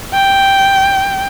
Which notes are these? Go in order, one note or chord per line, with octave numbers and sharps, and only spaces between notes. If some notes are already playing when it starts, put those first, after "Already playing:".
G5